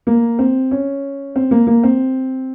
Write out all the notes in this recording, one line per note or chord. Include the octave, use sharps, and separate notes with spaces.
A#3
C4
C#4
C4
A#3
A#3
C4